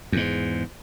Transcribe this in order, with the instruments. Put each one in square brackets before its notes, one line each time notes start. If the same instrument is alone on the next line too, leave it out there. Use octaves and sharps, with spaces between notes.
[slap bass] E2 G#2